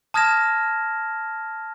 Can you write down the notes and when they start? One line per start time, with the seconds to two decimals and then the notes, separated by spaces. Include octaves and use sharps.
0.14 A5 D#6 F6 G#6 A#6 E7